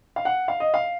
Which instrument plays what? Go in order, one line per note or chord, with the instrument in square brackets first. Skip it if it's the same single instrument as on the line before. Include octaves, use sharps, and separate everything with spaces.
[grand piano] F5
F#5
F5
D#5
F5